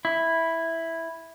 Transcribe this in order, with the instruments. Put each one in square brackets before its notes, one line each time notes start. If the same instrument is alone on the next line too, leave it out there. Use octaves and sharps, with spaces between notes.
[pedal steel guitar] E4